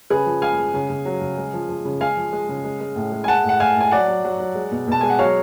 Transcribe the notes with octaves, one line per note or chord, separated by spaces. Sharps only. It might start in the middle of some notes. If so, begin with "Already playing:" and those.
C#3 G#4 B4
F3
G#3 F5 G#5
G#3
C#3
C#3
F#3
C#3
G#3
F3
F3
C#3
G#3 F5 G#5
F3
G#3
C#3
G#3
G#3
A2
G#3
G#5
G#3 F#5 A5
A2
F#5
A2 F5 G#5
A2 G#5
F#3 D5 F#5
F#3
F#3
F#3
G#3
B2
B2 A5
G#3 G#5
F#5
F#3 C#5 F5